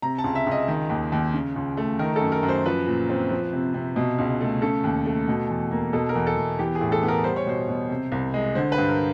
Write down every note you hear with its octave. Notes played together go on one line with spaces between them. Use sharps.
C3 A#5
A5
C#2
E5
C#2
D#5
D#3
D#2
D#2
C#3
C#2
A3
D#3 A#4
A4
F#2
A#4
F#2
C5
F3 B4
A#2
C4
F3
C3
C3
B2
C#2
A3
C#3 A4
D#2
A3
B2
E2
A#3
B2 A4
A#4
E2
A4
E2
E3 G4
G#4
A2
A4
B3
A#4
G3 C5
C#5
B2 C5
B2
C3
C2
G#3
D3 C5
B4
G2
A#4